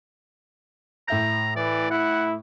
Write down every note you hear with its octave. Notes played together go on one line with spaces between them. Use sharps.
A2 E5 A#5 G6
E3 D5
E4 F#5